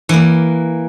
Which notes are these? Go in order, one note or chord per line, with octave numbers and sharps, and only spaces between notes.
E3 A#3